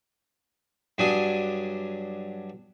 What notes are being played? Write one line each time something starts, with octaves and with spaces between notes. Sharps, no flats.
G2 F#3 D4 G#5 D#6